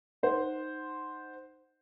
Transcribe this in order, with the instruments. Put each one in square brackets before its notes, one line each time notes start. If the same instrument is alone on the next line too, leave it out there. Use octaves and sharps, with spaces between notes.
[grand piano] D#4 C5 F#5